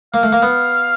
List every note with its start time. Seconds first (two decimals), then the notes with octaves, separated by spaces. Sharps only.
0.14 A#3 F5
0.23 A3
0.33 A#3
0.42 B3